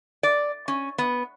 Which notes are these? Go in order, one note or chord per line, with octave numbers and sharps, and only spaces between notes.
D5
C#4
B3